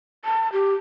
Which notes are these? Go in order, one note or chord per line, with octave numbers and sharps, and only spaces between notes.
A5
G4